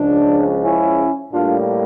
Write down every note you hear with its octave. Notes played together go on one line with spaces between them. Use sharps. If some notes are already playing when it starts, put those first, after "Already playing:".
Already playing: C#2 C#3 F3 D4
C#4 E4
A2 G3 A#3 D4 F4